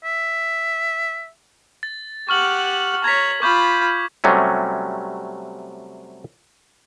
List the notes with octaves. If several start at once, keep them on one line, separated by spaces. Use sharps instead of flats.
E5
A6
G4 F#5 C#6 F6 F#7
C#5 A#5 G#6 B6
F4 B5 C#6 D6 G6
C3 F#3 G3 A3 C#4